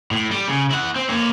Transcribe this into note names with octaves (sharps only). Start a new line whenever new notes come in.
A2
G3
C#3
E4 F#5
C4
A#3 C#5